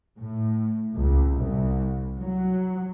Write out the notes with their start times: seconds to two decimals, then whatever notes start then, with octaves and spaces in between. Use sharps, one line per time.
0.18 A2
0.96 C#2
1.37 C2
2.21 F#3